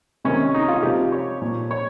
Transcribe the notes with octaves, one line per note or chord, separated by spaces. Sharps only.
C3 D#3 C#4
D#4
F4
C3 F3 G4
C#5
A#2 F3
C#5